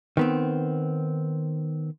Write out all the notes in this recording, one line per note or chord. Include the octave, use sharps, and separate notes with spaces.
D#3 B3 C4